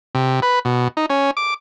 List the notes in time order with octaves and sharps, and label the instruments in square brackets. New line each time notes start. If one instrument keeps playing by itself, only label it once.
[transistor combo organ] C3
B4
B2
D#4
C#4
D6